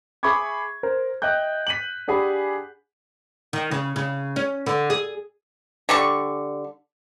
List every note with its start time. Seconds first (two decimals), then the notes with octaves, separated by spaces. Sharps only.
0.23 G#4 E5 B5 C#6 D6 G#6
0.83 A#4 C5
1.22 D#5 E5 G5 F#6 G6
1.67 B6 D#7 F#7
2.08 D4 G4 G#4 F#5 G#5 B5
3.53 D#3
3.71 C#3
3.96 C#3
4.36 C#4
4.66 D3
4.90 G#4
5.89 D3 G3 C#6